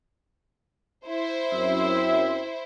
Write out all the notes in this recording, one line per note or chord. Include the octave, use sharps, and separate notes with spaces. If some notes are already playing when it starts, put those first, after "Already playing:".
E4 C5
F#2 C4 E5